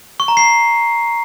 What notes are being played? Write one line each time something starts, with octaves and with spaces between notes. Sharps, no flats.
C#6
A#5
C7